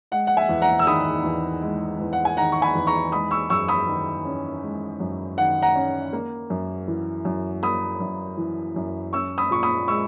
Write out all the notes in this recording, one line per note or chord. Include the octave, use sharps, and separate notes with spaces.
G#3 F#5
F#5
E5 G#5
E2
F#5 A#5
E6
D#3 B5 D#6
E2
G#3
E2
F#5
G#5
D#3 F#5 A#5
C#6
G#5 B5
E2
A#5 C#6
G#3 B5 D#6
C#6 E6
F#2 C#6 E6
B5 D#6
D#3
C#4
G#3
F#2
D#3 F#5
F#5 A#5
C#4
A#3
F#2
E3
F#2
A#3 B5 D#6
F#2
E3
F#2
C#4 C#6 E6
B5 D#6
A#2 C#6
B5 D#6
G#3 C#6 E6